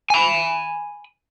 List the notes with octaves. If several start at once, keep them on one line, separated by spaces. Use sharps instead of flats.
G#5 B5